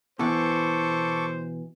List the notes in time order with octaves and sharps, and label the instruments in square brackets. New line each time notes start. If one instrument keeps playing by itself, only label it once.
[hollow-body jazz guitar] B2 E3 [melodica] A4 C#6 D6 [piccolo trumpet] C5